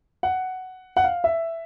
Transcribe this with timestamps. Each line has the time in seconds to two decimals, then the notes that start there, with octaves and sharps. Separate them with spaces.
0.23 F#5
0.97 F#5
1.04 F5
1.24 E5